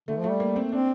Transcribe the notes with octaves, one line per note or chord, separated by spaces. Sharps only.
D3 A3
F3
A3
G3
A#3
C4
C4 D4